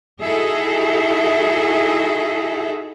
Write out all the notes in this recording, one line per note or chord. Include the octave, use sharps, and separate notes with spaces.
D#4 E4 F#4 G#4 A4 E5